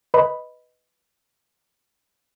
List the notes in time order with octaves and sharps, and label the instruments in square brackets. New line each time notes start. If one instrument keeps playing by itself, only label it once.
[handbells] B4 D#5 B5